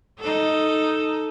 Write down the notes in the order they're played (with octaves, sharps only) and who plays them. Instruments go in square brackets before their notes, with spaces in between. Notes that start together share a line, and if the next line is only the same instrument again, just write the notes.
[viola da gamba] D#4 A4